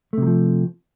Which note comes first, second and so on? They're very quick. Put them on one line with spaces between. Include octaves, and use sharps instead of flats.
A3 C3 F#3 F3